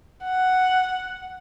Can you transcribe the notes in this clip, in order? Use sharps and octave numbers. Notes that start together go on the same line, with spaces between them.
F#5